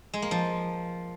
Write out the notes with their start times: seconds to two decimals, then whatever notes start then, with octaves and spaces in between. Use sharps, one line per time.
0.14 G#3
0.22 A#3
0.31 F3